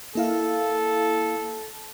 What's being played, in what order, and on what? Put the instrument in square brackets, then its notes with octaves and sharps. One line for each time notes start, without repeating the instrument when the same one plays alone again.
[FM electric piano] A#3 E4 F5 [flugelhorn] A4